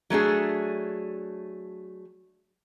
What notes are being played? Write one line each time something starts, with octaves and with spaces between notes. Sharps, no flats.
F#3 A3 D4 G#4